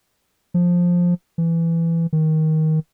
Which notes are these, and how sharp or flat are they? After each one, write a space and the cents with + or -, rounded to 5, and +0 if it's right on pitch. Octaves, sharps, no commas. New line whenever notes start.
F3 +10
E3 +15
D#3 +15